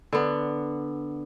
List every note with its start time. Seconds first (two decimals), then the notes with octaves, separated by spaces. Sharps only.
0.13 D3 B3